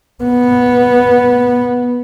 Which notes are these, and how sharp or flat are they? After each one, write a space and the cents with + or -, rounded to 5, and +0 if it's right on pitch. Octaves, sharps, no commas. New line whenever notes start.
B3 -10